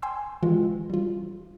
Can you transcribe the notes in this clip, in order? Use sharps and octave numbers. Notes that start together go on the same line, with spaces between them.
G5 G#5 C6 E6
E3 G#3 F4
G3 F4